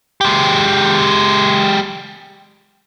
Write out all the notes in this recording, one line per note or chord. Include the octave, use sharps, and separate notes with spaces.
G#3 G4